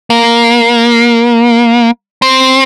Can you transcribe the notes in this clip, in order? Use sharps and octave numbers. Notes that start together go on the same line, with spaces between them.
A#3
C4